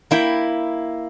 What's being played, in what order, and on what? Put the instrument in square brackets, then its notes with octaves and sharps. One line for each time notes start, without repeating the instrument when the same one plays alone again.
[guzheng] A#3 E4 G5 B5